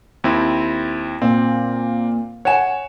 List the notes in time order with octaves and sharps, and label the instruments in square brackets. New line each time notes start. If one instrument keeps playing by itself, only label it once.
[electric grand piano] D#2 C4 E4
[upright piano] A#2 [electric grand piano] C4
[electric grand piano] C#5 E7 [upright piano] F#5 G#5